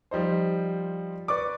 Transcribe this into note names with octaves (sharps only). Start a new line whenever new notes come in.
F3 G3 D#4 C5
B4 D5 C#6 D6